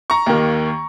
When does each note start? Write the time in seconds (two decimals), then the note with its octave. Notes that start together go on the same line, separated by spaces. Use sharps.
0.10 A#5 C#6
0.26 D#2 D#3 A#3